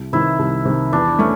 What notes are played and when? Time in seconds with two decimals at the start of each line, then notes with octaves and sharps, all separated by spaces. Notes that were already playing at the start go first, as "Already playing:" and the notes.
Already playing: C2
0.13 C3 D#3 E4
0.39 C2
0.65 C3 D#3
0.92 E2 D4
1.19 A3 C#4